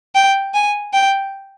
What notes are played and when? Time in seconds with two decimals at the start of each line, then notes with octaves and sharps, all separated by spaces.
0.15 G5
0.54 G#5
0.93 G5